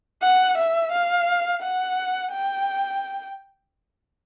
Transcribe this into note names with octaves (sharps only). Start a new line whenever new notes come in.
F#5
E5
F5
F#5
G5